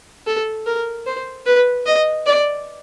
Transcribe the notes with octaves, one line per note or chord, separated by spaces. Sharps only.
A4
A#4
C5
B4
D#5
D5